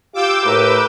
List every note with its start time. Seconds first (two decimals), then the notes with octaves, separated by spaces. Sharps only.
0.14 F4 G4 F5 D6 E6 G6
0.45 A2 G4 A#4 B4